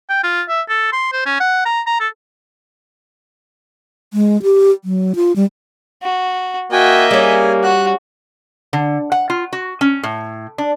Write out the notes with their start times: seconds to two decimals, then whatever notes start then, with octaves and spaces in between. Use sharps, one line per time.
0.09 G5
0.23 F4
0.49 E5
0.69 A4
0.92 C6
1.13 C5
1.26 C#4
1.40 F#5
1.65 A#5
1.87 A#5
2.00 A4
4.14 G#3
4.43 G4
4.85 F#3
5.15 F4
5.36 G3
6.03 F#4
6.72 A#3 F#4 D#5 E5 G5 G#5
7.11 G3 C#4 G#4
7.63 F#4 F#6
8.73 D3
9.12 F#5
9.30 F4
9.53 F#4
9.81 C#4
10.03 A2
10.58 D4